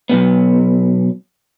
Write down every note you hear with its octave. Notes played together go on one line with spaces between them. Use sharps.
B1 G#2 B3